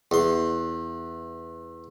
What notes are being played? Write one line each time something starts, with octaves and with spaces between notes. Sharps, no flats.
E2 C6